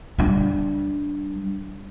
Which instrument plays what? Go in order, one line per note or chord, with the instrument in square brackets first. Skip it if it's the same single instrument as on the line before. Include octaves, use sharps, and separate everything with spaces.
[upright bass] G3 D4